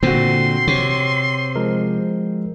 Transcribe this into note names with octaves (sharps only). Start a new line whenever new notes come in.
A#2 D3 C4 F#4 C6
C3 C#5
F3 G#3 A#4